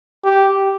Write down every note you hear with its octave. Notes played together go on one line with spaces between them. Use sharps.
G4